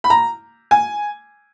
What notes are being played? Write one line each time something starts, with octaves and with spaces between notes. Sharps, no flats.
B5
A#5
G#5